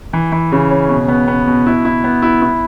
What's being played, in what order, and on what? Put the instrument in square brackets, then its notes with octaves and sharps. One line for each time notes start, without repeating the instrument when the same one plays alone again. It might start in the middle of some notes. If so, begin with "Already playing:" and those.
[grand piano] E3
E3
C#3
C#4
B2
B3
B3
B2
E4
E4
B3
E4
E4